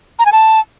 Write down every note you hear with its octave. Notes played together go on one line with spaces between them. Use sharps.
A#5
G#5
A5